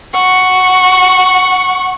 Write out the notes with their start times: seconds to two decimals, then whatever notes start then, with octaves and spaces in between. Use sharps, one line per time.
0.14 F#5 C#6